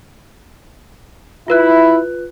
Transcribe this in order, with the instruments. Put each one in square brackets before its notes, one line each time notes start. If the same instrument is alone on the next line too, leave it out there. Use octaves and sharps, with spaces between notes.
[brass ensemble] E4 [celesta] F4 B4 F#6